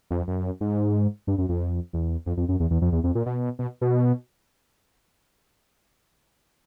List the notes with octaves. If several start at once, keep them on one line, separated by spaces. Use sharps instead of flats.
F2
F#2
G#2
G2
F#2
F2
E2
F2
F2
F#2
E2
E2
F2
E2
F2
A#2
B2
B2
B2